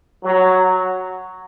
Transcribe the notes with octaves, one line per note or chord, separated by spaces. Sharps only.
F#3